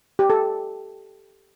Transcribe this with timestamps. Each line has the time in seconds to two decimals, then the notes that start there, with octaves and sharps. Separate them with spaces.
0.19 G4
0.30 A4